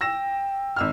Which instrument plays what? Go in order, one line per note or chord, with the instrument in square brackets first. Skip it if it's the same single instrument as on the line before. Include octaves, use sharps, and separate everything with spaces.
[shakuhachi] G5 [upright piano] E6 A#6 E7
[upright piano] G#1 E6 F6